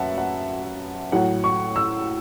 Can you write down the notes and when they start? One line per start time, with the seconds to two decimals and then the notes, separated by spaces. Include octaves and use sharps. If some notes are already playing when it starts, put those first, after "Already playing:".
Already playing: F#2 B4 E5 F#5 A5
0.18 F#5
1.12 A2 F#3 F#5
1.44 C#6
1.76 E6